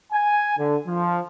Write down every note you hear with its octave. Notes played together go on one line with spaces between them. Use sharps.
G#5
D3
F3